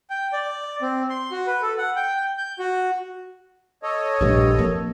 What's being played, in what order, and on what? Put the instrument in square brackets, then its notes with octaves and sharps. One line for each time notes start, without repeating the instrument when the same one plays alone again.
[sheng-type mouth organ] G5
D5
C4
C6
F#4
B4
A4
F#5
G5
G6
F#4
[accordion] A4 C#5 D#5
[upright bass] A#1 F4 [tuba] G2
[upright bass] F3 C4 [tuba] A#3